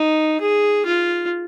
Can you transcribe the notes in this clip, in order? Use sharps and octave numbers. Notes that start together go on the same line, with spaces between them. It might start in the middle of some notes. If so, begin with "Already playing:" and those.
Already playing: D#4
G#4
F4